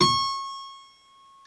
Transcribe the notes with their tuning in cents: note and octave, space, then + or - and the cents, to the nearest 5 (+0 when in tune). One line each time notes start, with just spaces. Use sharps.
C#6 -25